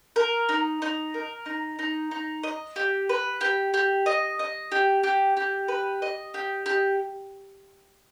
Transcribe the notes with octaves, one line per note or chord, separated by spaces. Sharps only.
A#4
D#4
D#4
A#4
D#4
D#4
D#4
D#5
G4
B4
G4
G4
D#5
D#5
G4
G4
G4
B4
D#5
G4
G4